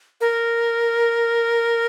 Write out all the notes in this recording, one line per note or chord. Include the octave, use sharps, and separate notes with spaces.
A#4